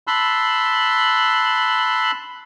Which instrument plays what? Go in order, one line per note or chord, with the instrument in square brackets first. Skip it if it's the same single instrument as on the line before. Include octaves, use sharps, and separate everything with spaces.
[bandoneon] A5 B5 C6 E6 F#6